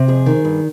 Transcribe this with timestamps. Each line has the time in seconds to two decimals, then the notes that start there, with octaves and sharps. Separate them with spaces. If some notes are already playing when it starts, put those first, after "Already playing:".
Already playing: C3
0.08 F2 G#4
0.26 D#3
0.45 G2